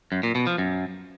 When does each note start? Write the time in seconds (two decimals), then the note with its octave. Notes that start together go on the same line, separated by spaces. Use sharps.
0.12 F#2
0.23 A#2
0.35 B2
0.47 F3
0.58 F#2